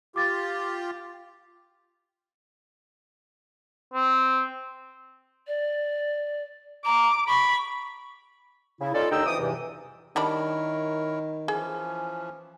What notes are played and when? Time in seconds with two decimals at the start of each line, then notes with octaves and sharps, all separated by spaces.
0.16 F4 G4 D6 A6
3.93 C4
5.47 D5
6.85 A#5 D6
7.28 B5 C#6
8.81 C#3 E4
8.94 C#4 D#4 F4 A4 D5
9.12 D#2 D3 D#4 D#5 G5 E6
9.25 F2 E3 D6 D#6
9.39 E2 G2 C3 E3
10.16 D#3 G3 D4 E4 A#4 C#5 B5
11.48 E3 F3 C#4 G#4